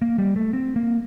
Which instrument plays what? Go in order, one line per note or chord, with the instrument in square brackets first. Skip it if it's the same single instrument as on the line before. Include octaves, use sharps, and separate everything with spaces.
[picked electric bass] A#3
G3
A3
C4
A#3